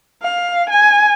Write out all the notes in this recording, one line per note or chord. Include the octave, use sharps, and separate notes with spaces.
F5
G#5